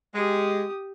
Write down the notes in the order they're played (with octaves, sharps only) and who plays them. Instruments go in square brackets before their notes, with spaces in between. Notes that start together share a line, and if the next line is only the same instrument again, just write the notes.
[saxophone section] G#3 [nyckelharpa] G4 D#6